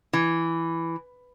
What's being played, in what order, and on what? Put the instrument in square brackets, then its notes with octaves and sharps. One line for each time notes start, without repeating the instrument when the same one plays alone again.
[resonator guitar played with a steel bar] E3